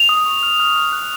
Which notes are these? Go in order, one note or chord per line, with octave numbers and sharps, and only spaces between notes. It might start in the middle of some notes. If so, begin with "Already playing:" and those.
Already playing: F7
D#6
C#6
F6
F6
F6
F#6